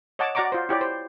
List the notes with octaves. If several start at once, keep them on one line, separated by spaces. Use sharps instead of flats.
C#5 D#5 F#5 A5 D6
F#4 D5 F#5 A#5 C#6 D6
F4 C5
E4 G4 C#5 D5
C5